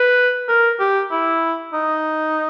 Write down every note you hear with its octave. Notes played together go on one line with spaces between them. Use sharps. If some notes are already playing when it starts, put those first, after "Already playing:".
Already playing: B4
A#4
G4
E4
D#4